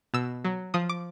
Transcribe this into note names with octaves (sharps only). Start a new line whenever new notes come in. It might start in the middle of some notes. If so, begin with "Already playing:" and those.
B2 E6
F#3
F3 D#6
D6